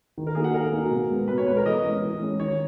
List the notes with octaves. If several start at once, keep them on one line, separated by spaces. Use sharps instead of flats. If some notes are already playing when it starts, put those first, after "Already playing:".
D#3
A#4
A#3 D#4 F#4 G#4
F#5
D#3 A#4
A#3 D#4 F#4
B2
G#3 B3
B2 B4
C#5
G#3 B3 B4
A#4
E3 D#5
G#3 C#4
E3
G#3 C#4
D#3 C#5